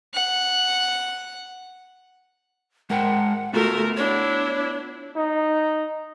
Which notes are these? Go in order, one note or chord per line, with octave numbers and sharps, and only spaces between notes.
F#5
G#3 A#4 F#5 G5
A3 B3 F4 F#4 A#4
D4 E4 C#5
D#4